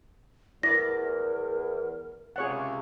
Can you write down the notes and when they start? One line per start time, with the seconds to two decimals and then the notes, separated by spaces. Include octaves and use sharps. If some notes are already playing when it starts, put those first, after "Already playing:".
0.63 E2 E4 A#4 D5 A#6
2.36 C#2 C3 G#4 C#5 F#5